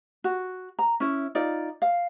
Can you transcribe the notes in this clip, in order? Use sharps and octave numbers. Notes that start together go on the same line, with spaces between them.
F#4
A#5
C#4 E4
D#4 F4 D5
F5